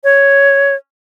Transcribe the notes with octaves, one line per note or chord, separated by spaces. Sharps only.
C#5